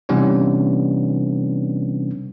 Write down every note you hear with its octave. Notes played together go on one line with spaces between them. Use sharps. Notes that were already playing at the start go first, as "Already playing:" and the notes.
C3 E3 G3 B3 C#4 D4